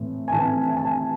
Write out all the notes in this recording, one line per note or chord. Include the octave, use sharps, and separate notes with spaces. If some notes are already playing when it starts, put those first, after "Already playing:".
Already playing: A2 E3 A3 C4
G#5
A2 E3 A3 C4 A5
G#5
A5
G#5